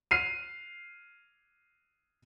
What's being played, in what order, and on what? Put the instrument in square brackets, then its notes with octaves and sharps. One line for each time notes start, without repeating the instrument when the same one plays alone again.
[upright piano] F6 C7 D#7